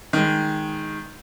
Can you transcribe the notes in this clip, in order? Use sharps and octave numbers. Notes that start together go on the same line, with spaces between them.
D#3 G#3